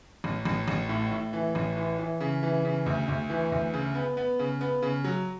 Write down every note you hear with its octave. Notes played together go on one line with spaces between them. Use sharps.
A1
A1
A1
A2
A2
E3
A1
E3
E3
C#3
E3
C#3
D2
D2
E3
D2
C#3
B3
B3
C#3
B3
C#3
F#3